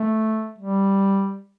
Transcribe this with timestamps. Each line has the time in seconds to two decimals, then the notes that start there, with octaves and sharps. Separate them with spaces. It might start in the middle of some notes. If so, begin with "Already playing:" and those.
Already playing: A3
0.58 G3